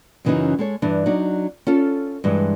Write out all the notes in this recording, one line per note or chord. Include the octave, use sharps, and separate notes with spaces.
F#2 C#3 E3 F#3 C#4 D#4
G#3 A4 C#5
G2 E3 D4
F#3 D4 D#4
C#4 F4 A4
G2 E3 G#3